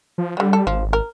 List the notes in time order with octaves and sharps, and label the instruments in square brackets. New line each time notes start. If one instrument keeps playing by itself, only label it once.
[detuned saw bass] F3
[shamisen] D3 F#3 [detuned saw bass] G3
[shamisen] A4
[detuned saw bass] G#1 [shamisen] F3
[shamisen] A#4